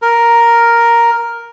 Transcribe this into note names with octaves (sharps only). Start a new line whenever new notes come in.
A#4